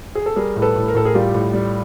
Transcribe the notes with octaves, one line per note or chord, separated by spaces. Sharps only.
G#4
A4
G3 G#4 A#4
A2
A4 B4
A2
A#4
A2 A4
G#4 A#4
G3 F4 G4
A2
G3